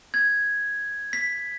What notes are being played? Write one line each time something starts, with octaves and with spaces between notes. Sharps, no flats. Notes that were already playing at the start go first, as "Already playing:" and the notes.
G#6
B6